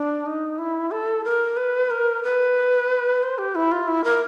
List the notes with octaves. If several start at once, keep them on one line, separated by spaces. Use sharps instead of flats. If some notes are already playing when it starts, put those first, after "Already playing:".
Already playing: D4
D#4
E4
A4
A#4
B4
A#4
B4
C5
G4
E4
F4
E4
A#4